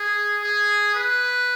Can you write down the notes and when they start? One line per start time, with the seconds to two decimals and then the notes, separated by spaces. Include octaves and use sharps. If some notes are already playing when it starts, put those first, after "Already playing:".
Already playing: G#4
0.43 G#4
0.95 B4